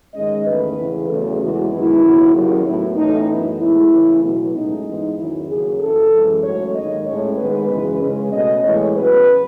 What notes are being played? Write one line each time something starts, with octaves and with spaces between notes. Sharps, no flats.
G#2 D#3 G#3 C#4 D#5
E2 D#3 A3 C#4 B4
E2 C#3 E3
E2 C#3 F#3 A3 C#4 A4
E2 C#3 E3 G#3 B3 F#4
F#2 D#3 G#3 B3 E4
D#2 C#3 F#3 B3
D#2 C#3 F#3
A2 F#3 B3 E4
A2 E3 A3 C#4 D#4
F#2 E3 B3 E4
A2 G#3 B3 E4
C#3 E3 A3 C#4
B2 F#3 B3
A2 G#3 C#4 D#4
G#2 E3 B3
E2 D#3 F#3 C#4 E4
D#2 C#3 F#3 C#4 G#4
F#2 C#3 E3 A4
F#2 E3 G#3 C#4
G#2 F#3 A3 C#4 C#5
D#2 D#3 G#3 D#5
A2 G#3 C#4 C#5
G#2 D#3 G#3 B3 B4
F#2 C#3 E3 G#3 C#4
C#3 G#3 C#4
B2 A3 C#4 D#5
A2 E3 G#3 B3 C#5
E2 C#3 F#3 C#4 B4